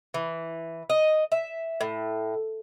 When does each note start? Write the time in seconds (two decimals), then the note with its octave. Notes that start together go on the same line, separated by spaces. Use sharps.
0.14 E3
0.90 D#5
1.32 E5
1.81 A2